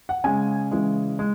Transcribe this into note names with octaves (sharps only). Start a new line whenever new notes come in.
F#5
C#3 G#3 G#5
C#3 E3 G#3
G#3